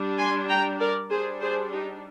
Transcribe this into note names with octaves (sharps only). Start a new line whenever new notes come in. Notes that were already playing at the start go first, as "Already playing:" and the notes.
Already playing: G3 D4
G#5 C6
G5 A#5
A#4 D5
G3 D4 G#4 C5
G#4 C5
D#4 G4